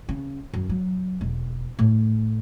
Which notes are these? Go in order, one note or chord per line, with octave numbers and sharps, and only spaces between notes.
C#3
F#2
F#3
E1
A2